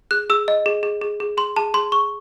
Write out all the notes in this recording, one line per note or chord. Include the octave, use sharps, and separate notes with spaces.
G#4 F#6
G#4 E6
D#5
G#4
G#4
G#4
G#4
G#4 C6
G#4 A5
G#4 C6
G#4 C#6